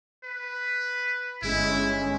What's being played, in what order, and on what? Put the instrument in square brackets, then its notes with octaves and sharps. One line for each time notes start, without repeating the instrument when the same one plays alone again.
[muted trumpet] B4
[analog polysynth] G1 G#3 C#4 [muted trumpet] E4